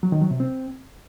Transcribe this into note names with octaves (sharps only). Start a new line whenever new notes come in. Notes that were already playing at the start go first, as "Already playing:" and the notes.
F#3
D#3
F#3
C3
C4